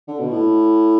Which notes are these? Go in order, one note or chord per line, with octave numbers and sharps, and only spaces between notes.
D3
B2
A2